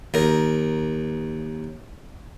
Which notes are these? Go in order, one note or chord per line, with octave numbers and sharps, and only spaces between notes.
D#2 A#4